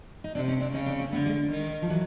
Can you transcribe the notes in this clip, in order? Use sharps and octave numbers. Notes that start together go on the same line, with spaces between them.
D#4
C3 C4 D4
C#4 D#4
C4 D4
C#3 C#4 D#4
C4 D4
A#3 C4
D3 A3 B3
G#3 A#3
D#3
F3
E3 F#3